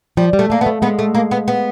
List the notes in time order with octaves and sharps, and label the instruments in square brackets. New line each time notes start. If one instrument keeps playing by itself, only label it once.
[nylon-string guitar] F3 [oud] G3
[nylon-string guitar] G3
[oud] A3
[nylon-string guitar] A3 [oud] A#3
[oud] B3
[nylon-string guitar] A3
[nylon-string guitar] G#3 [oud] B3
[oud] A3
A#3
B3
B3